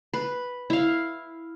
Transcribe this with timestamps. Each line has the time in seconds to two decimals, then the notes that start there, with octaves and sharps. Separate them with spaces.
0.13 B4
0.70 E4 F5